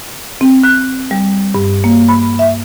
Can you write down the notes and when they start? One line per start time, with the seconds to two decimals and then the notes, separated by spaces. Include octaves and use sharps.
0.41 C4
0.63 F#6
1.11 G3
1.55 G2
1.84 A#3
2.09 B5
2.39 E5